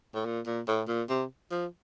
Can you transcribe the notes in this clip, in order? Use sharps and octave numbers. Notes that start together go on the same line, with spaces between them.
A2
A#2
A#2
A2
A#2
C3
F3